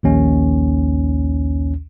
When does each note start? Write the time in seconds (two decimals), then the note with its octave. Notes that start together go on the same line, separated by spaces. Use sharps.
0.03 A#1 D#2 C#4